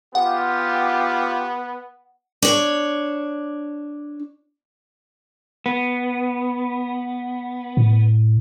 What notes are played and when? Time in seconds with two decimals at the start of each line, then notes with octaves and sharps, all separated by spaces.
0.15 B3 F4 G4 F#5
2.42 D4 C#5
5.66 B3
7.77 A2